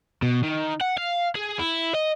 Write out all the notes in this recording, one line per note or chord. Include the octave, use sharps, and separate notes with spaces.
B2
D#3
F#5
F5
G#4
E4
D#5